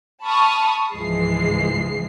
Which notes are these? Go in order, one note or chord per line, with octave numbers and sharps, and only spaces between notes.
A5 B5 C#6 D#6 F6
C#2 G#2 E3 F3 G#3 C7